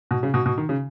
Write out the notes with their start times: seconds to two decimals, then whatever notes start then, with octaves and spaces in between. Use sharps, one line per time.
0.11 B2
0.23 C#3
0.34 B2
0.46 B2
0.58 D#3
0.69 C#3